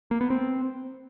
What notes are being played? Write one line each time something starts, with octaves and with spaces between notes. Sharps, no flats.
A#3
B3
C4